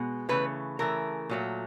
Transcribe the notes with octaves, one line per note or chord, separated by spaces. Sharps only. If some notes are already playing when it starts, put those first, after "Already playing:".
Already playing: B2 G#3
C#3 E3 A3 B4
C#3 E3 A3 A#4
A#2 F#3 A3